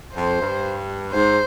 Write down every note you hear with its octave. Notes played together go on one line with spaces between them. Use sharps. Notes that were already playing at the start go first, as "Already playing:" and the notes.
F2 C5
G2
G#2 C5